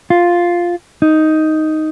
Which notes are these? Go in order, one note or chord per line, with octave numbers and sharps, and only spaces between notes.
F4
D#4